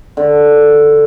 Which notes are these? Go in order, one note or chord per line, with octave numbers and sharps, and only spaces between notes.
D3